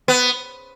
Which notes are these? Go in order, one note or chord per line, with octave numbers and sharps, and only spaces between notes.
B3